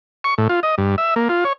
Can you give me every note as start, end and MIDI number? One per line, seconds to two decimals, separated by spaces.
0.24 0.34 85
0.38 0.48 45
0.49 0.60 65
0.63 0.75 75
0.78 0.96 43
0.98 1.14 76
1.16 1.28 58
1.29 1.44 65
1.45 1.53 73